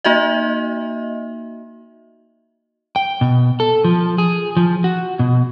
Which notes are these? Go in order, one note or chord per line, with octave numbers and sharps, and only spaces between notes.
A#3 D#4 F#4 D#5 E5
G5
B2
A4
F3
G#4
F3
F#4
B2